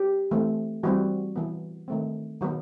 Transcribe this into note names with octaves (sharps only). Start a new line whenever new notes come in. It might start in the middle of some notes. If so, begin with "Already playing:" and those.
Already playing: G4
E3 A3 C4
E3 G3 C4 F#4
E3 B3
D#3 A3 C4
D#3 F#3 B3